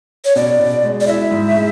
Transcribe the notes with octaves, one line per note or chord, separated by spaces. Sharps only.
C#5
B2 D5
B2
G#3
D5
E4 E5
G#2
G#3